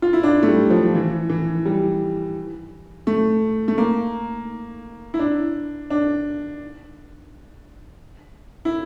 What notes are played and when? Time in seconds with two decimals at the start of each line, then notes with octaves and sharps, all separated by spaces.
0.02 F4
0.13 E4
0.23 D4
0.43 A3
0.48 G3
0.70 F3
0.95 E3
1.29 E3
1.66 G3
3.07 A3
3.68 A3
3.78 A#3
5.14 E4
5.19 D4
5.90 D4
8.65 E4